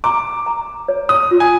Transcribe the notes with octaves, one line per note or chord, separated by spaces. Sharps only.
A#5 D6
A#5
C#5
D#6
F4
G#5